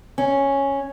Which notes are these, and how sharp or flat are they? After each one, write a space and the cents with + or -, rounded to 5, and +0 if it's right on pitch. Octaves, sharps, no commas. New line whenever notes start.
C#4 -5